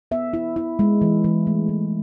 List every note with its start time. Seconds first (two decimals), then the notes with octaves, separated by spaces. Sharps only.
0.11 B3 E5
0.33 E4
0.56 E4
0.79 G#3
1.02 E3
1.24 E3
1.47 A3
1.69 E3